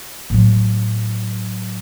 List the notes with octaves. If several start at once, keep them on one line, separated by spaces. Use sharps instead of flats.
A2 F#3